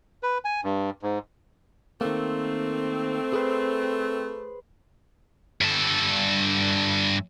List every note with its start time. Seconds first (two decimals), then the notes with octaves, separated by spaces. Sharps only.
0.23 B4
0.45 G#5
0.64 G2
1.03 G#2
2.01 D#3 A3 A#3 C4
3.33 G#4 B4 C5
5.61 G2 A4